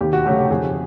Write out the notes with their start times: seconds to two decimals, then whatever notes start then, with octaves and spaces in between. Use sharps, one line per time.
0.01 D#2 G4
0.13 F#4
0.26 C#3 F#3 A3 G4
0.39 G4
0.50 F2 G#4